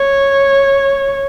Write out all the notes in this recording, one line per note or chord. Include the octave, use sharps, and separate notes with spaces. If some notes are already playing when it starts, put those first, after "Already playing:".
Already playing: C#5